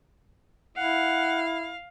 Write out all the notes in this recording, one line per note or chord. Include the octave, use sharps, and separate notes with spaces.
E4 F5 F#5